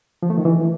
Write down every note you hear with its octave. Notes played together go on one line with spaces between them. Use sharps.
F3
A3
D#3
E3